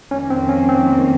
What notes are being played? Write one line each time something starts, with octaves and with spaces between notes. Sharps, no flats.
F2 D#3 A#3 C#4
C4
C#4
C4